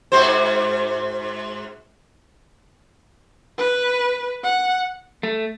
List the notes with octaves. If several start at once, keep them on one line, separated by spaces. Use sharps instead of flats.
G#2 F#4 C5
B4
F#5
A3